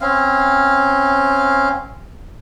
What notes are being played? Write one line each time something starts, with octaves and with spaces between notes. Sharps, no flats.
C4 C#4 F5